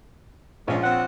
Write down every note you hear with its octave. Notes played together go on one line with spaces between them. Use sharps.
A#1 F3 G#3 C#4 F4 C#5
C4 F#5